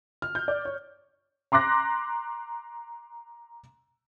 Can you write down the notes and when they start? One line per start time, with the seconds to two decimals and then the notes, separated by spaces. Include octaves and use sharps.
0.22 F6
0.35 G6
0.48 D5
0.65 C#5
1.52 A#5 C6 D6 F#6 A#6